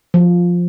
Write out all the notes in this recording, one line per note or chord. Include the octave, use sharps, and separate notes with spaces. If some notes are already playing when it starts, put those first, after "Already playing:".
F3